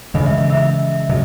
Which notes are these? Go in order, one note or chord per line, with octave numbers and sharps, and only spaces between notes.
C#3 E3 G#3 D#5
E5
E5
E5
C#3 F#3 D#5